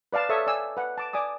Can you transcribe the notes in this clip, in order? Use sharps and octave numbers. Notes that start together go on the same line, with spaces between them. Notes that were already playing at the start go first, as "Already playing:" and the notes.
B4 D5 F5 A5
A4 C#5 E5 C#6 D#6
D5 G5 G#5 E6
B4 F#5
A5 D6
D5 G#5 D6 D#6